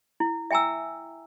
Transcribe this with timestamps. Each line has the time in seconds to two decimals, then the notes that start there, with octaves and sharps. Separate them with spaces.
0.20 E4
0.51 E5 G5 G#5 A#5 E6